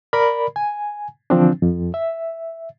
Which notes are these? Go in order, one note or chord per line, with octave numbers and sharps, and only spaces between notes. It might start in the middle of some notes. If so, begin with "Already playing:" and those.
A#4 D5 B5
G#5
D3 E3 F3 C4 D4
F2
E5